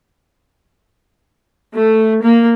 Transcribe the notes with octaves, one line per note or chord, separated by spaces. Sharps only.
A3
A#3